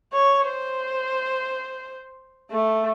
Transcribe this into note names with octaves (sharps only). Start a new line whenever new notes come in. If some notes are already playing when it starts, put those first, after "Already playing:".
C#5
C5
A3